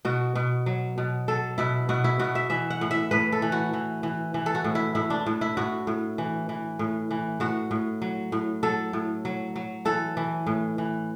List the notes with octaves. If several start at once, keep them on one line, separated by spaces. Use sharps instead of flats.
B2 F#4
B2
F#3
B2
F#3 A4
B2 E4
B2 F#4
E4
B2 F#4
E5
E3 E5
F#5
A2
E5
A2 B4
A4
E3
F#4
E3
E3
E3
A4
F#4
A2
E4
A2 E4
D4
A2
E4
A2 F#4
A2
E3
E3
A2
E3
A2 F#4
A2
F#3
A2
F#3 A4
A2
F#3
F#3
E3 A4
E3
A2
E3